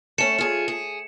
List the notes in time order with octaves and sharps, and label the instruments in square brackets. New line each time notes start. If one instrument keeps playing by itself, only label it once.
[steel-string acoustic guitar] A3 C#4 [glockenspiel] C#7 E7
[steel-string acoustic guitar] F4 G#4
G#4